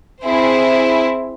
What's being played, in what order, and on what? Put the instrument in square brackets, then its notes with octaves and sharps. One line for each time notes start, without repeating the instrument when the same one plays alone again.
[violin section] C4 E4 G#4